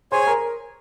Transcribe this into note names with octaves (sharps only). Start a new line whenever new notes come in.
G#4 C5 C#5 G#5 C6
A#4 A#5